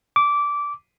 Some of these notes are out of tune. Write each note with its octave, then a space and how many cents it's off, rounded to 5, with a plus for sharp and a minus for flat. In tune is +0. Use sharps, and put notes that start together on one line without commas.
D6 -15